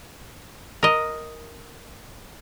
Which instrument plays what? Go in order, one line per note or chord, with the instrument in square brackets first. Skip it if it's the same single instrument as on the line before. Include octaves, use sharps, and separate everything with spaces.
[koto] A#4 D#5